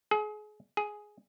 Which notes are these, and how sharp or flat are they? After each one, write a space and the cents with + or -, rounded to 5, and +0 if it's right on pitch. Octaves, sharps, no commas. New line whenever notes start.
G#4 +30
G#4 +5